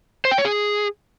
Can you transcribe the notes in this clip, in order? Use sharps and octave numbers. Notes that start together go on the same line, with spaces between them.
C5
G5
C#5
G#4